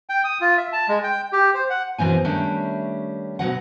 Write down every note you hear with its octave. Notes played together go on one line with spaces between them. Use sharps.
G5
D#6
F4
E5
A5
G#3
G5
G4
C5
F#5
F#2 B2 E3 C4 G#5
D#3 G3 A3 C#4 D4 E5
B2 F3 F#3 F#5